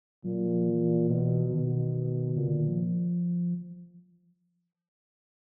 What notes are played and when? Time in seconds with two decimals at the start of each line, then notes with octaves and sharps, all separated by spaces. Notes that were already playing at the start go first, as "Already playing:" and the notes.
0.24 A#2 F#3
0.46 F3
0.68 E3
1.10 B2
1.52 B2 D#3
2.36 A#2 C#3
2.48 D3
2.57 D#3
2.68 F3